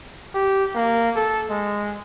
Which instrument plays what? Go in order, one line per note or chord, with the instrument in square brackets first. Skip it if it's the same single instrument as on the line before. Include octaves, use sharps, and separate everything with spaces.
[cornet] G4
A#3
A4
G#3